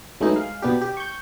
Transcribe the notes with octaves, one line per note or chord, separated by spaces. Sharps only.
F#3 G#3 A3 B3 D#4 E4
G#3 F5
B2 B3 D4 G4
G4
C#6 G6